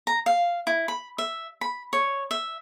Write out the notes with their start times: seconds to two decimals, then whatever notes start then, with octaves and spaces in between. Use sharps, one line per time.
0.07 A#5
0.26 F5
0.67 E4
0.88 B5
1.18 E5
1.61 B5
1.93 C#5
2.31 E5